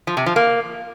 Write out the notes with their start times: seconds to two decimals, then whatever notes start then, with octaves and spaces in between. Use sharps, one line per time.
0.07 F3
0.17 C3
0.26 F3
0.36 A#3